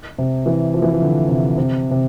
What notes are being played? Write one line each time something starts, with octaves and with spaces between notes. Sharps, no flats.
C3
E3
F3
E3
F3
D3
C3
C3
C3